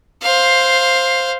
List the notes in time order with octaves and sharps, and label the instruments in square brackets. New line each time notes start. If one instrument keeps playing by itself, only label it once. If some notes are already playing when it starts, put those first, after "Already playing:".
[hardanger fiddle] C5 F5